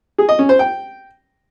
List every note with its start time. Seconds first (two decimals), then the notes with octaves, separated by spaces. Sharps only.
0.18 G#4
0.29 D#5
0.39 C#4
0.49 C5
0.59 G5